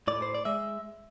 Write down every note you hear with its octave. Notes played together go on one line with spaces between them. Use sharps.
A2 D5
C5
D5
G#3 E5